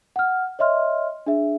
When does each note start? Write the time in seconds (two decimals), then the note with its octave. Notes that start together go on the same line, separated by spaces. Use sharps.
0.16 F#5 F6
0.59 C#5 D#5 E5 C6 F6
1.26 D4 G#4 E5